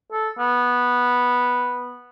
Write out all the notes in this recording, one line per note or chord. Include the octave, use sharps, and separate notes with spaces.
A4
B3